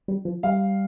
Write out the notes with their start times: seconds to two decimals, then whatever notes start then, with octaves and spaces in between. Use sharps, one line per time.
0.08 G3
0.25 F3
0.43 G3 F5